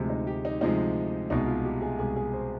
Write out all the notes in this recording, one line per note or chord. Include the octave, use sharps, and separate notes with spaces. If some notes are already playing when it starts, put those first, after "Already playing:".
Already playing: D2 C3 F3 G#3
D#4
G4
D#4
D2 C3 F3 G#3 D#4
C2 B2 G#3 D#4
F4
G4
G#4
C2 B2 G#3 G#4
G#4
C5